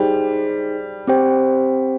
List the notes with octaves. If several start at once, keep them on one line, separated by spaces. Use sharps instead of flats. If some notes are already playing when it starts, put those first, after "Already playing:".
Already playing: G3 D#4 G#4 C5 G5
C4 G4 C5 G5